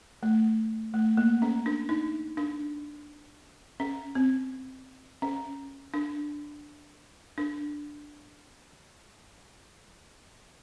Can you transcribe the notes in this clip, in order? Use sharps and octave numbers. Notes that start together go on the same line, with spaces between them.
A3
A3
A#3
C#4
D4
D#4
D4
C#4
C4
C#4
D4
D4